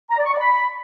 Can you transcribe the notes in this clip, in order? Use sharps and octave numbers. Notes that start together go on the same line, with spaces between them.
A#5
D5
C#6
D5
B5